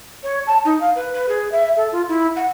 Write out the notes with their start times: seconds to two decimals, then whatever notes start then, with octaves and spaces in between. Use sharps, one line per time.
0.23 C#5
0.47 A5
0.65 D#4
0.80 F5
0.95 B4
1.13 B4
1.29 G#4
1.52 E5
1.76 A4
1.92 F4
2.09 E4
2.36 F#5